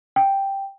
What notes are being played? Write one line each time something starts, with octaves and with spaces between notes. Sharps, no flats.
G5